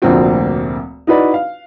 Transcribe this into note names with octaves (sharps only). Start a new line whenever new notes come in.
F1 D2 A#2 A#3 C4 F#4
D#4 E4 F#4 B4 D5
F5